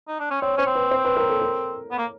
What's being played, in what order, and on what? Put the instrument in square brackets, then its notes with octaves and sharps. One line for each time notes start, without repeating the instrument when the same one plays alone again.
[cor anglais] D#4
D4
C#4
[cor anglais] C4 [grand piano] C#5
[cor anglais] C#4 [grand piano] C5
[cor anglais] C4
[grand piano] B4
C5
B4
A#4
A4
A#4
[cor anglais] B3
A#3